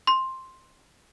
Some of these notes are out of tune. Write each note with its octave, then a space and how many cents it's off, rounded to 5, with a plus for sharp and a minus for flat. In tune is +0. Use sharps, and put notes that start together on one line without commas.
C6 +5